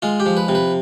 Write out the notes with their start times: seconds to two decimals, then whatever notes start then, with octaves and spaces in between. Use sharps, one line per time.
0.02 G#3 F4
0.20 G4
0.26 F3
0.37 B4
0.48 C3
0.55 B4